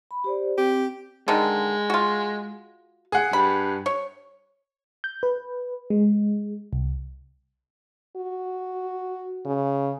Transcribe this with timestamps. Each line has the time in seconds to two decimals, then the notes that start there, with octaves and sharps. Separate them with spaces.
0.11 B5
0.24 G4 C5 D5
0.57 C4 G4
1.28 D3 D#3 G#3
1.90 F4 F#4
3.12 G#4 F#5
3.33 G2 B5
3.86 C#5
5.04 G6
5.23 B4
5.90 G#3
6.73 C2
8.17 F#4
9.46 C#3